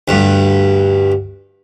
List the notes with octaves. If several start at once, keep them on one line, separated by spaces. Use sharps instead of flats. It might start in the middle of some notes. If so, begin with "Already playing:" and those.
D2 G2